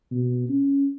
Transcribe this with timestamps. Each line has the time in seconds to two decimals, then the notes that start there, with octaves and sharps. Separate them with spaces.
0.11 B2
0.49 C#4